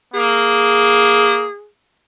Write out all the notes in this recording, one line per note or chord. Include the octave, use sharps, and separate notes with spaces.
A#3 G#4